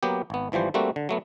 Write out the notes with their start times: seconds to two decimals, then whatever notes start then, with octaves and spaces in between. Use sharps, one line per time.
0.03 F#3 A#3 B3 G4
0.30 G#1 B3
0.52 G#1 E3 F3 G3 C5
0.74 G3 A3 A#3 C4 F#4
0.96 D3
1.09 F#3 A3 B3